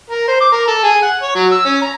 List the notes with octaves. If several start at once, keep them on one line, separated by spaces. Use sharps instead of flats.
A#4
C5
D6
A#4
A4
G#4
F#5
C#5
F#3
E6
C#4
A#5